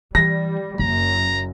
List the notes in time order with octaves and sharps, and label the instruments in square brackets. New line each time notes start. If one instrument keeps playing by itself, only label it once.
[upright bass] E3 [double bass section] G3 [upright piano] A#6
[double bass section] F#1 F#2 [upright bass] A#3 [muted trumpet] A#5